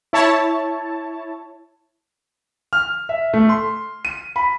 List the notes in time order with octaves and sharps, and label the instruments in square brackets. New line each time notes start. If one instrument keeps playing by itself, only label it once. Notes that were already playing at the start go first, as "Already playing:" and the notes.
[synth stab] E4 C#5 A5
[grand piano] F6
E5
A3
C6
D#7
B5